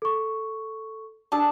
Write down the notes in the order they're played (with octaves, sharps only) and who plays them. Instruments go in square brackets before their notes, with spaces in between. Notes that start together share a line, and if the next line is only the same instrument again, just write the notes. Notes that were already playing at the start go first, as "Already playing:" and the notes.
[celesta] A4 C#6
[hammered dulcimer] D4 G#4 A4 [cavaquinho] A5